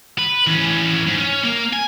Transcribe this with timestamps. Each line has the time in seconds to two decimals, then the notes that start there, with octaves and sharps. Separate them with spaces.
0.18 B4
0.47 E3 C#4
1.07 G#2
1.19 C#4
1.44 A#3 A#4
1.73 G#5